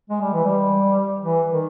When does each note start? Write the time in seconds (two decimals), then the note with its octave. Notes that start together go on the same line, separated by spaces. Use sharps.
0.10 G#3
0.22 G3
0.33 E3
0.44 G3
1.22 E3
1.50 D#3